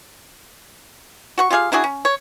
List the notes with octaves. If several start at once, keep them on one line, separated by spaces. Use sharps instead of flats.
F#4 F#5 C#6
F4 G4 G#4 F5
D4 E4 F#4 G#4
C#4
C#5